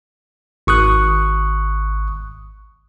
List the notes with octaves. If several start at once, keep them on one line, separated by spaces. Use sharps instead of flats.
G#1 C#6 D#6 F#6